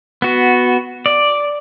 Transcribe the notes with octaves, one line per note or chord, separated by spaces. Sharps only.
B3 F#4
D5